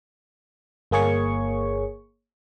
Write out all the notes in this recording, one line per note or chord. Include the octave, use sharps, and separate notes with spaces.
G1 A#3 G#4 C#5 C#6